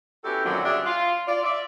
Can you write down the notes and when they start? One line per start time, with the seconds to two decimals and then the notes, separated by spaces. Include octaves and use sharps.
0.24 B3 C#4 E4 F#4 G4 A4
0.45 F#2 A#2 D3 D#3 F#3 C4
0.64 G3 C#4 D4 G#4 E5
0.85 F4
1.28 F4 D5
1.44 D5 E5